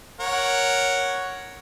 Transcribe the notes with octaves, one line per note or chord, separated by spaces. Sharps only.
A#4 C#5 F#5